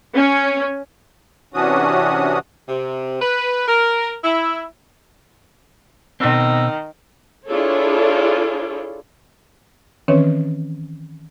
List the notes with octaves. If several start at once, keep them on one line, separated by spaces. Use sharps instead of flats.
C#4
C3 E3 C#4 D4 F#4 D#6
C3
B4
A#4
E4
B2 D#3 C4 E6
D4 E4 F4 G#4 A4 C#5
D#3 E3 C4 C#4 B4 C#5